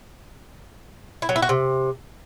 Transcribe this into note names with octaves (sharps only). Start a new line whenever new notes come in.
E4
F#3
E4
F#4
C3